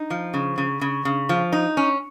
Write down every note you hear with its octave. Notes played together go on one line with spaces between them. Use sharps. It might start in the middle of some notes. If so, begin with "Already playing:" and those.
Already playing: D#4
F3
C#3
C#3
C#3
C#3
F3
D#4
C#4